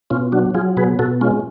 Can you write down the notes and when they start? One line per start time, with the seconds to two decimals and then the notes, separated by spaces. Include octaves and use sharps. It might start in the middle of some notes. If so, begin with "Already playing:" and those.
0.10 B2 C#4 F4
0.32 F#3 D4 F#4
0.54 F#3 F4 G#4
0.77 B2 G#4 B4
0.99 B2 F#4 A4
1.21 G#3 C#4 F4